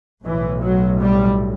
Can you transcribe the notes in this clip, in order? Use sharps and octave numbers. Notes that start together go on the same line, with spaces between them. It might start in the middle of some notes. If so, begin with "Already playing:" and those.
B1 A2 E3
F#3
G3